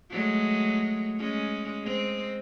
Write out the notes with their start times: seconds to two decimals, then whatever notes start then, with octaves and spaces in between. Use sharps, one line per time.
0.10 F#3 G#3 A3
1.16 G#3 C#4
1.83 G#3 C4